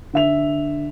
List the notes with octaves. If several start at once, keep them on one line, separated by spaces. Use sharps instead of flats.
D3 E5 F7